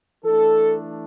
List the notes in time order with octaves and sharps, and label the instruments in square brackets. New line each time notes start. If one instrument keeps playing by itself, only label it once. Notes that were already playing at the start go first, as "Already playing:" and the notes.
[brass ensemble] E3 A3 D4 A4